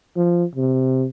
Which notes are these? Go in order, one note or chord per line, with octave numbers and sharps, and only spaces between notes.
F3
C3